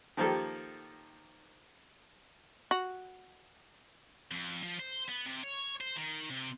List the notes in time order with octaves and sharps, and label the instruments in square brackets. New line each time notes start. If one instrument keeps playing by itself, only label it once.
[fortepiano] D#3 F3 A#3 G4 A4
[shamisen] F#4
[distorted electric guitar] F2
F3
C5
B3
C3
C#5
C5
D#3
C3